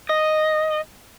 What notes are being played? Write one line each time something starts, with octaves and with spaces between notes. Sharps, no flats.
D#5